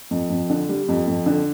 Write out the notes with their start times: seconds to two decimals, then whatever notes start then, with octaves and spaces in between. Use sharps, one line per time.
0.11 F2
0.30 F2
0.50 D3
0.69 G3
0.88 F2
1.07 F2
1.26 D3